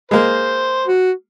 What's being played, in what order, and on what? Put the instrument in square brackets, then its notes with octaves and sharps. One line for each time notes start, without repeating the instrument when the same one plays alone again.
[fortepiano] G#3 A#3 [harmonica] C5
[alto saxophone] F#4